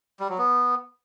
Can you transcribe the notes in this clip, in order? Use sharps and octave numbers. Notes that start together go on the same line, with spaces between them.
G3
F#3
B3